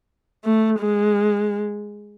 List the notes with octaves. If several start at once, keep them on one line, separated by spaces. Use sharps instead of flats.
A3
G#3